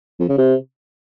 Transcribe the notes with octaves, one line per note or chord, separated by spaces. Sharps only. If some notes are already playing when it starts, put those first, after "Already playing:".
F2
C#3
C3